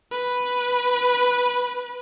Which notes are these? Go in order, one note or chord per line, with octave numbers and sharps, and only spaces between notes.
B4